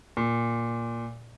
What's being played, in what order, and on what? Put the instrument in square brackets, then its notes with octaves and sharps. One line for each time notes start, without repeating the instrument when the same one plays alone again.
[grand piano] A#2